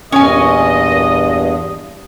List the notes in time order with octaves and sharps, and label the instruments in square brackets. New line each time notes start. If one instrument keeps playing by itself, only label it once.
[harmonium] E2 G2 [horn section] A#2 D#5 [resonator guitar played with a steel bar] C#4 C#5 G#5 [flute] D#6